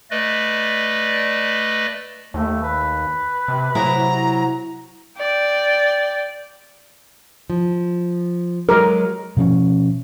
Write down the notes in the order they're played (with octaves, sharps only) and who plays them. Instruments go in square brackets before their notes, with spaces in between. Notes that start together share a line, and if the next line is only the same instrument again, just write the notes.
[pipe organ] A3 B4 D5 D#5
[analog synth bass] D#2 [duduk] A3
[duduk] B4
[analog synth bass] C3
[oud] C3 E4 G#4 [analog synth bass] F#3 [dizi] A#5
[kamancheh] D5 G5
[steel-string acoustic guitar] F3
[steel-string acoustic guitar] F#3 G#3 [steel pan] A#4
[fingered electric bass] B2 F3 C4 C#4